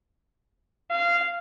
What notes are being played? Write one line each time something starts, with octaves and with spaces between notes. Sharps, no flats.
F5